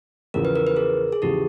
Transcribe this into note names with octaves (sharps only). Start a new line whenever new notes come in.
E2 C#3 F3 A#4
B4
A#4
B4
G#4 A#4
G#4
E2 C#3 F3 G4 A4